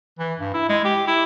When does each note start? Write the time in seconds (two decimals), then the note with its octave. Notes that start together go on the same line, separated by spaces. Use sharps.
0.19 E3
0.40 G2
0.54 E4
0.69 G#3
0.85 G4
1.07 E4